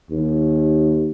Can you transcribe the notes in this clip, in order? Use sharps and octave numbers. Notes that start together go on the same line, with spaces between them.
D#2